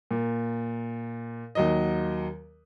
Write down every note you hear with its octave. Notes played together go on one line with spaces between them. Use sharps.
A#2
D#2 F#3 D#5